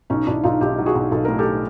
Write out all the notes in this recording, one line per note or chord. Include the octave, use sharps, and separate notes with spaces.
B1 C#4 D#4
B1 D4 E4
B1 D#4 F4
B1 F4 G4
F#3
F#4 G#4
B1
B1 A4
A2 A#4
G4 A4